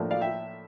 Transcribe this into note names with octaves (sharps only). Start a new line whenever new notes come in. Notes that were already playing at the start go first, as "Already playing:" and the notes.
Already playing: A2 F3 A#3 D4
D5 F5
E5 G5